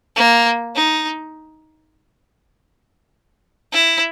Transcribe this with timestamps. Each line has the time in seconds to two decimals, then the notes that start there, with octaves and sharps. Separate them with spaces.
0.16 A#3
0.76 D#4
3.72 E4